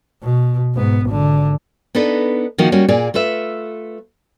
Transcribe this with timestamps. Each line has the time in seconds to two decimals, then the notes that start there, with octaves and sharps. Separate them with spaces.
0.23 B2
0.74 G#2 B3
1.06 G#1 D3
1.95 B3 D4 D#4 A4 B4
2.58 D#3 F3 A#3 D#4 F#4
2.72 G3 A#3 C#4 F#4
2.89 A#2 A#3 G#4 D5
3.14 A3 F4 B4 E5